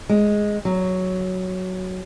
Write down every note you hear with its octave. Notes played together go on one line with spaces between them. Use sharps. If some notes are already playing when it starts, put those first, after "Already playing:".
G#3
F#3